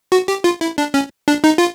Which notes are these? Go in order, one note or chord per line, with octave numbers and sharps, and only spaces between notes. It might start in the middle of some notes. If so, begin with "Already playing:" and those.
F#4
G4
F4
E4
D4
C#4
D4
D#4
F4